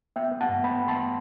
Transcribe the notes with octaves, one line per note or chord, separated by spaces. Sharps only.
B3 E5 G5
B3
F#5 A5
G2
B3 G5 B5
B3
A5 C6